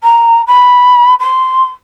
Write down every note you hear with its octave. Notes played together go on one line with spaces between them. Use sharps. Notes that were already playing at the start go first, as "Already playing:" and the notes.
A#5
B5
C6